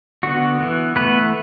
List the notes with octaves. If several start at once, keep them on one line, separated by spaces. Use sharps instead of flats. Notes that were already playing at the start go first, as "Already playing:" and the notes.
D3 B3 F#4
E3 B3
E3 A3 B3 B4